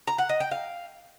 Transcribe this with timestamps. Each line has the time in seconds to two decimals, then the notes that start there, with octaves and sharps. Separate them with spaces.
0.07 A#5
0.18 F#5
0.29 D#5
0.40 G5
0.51 F5